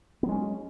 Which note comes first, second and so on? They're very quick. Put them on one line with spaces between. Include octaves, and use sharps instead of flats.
B3 F#3 G#3 C#4